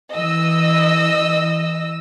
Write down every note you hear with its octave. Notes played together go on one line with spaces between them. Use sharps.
E3 D#5 E6